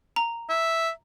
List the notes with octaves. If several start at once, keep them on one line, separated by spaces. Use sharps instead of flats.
A#5
E5